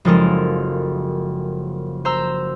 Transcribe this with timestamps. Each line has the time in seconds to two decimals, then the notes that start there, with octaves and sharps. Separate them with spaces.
0.05 F#1 F3 G#3 A4 A#4
2.05 C5 A#5 E6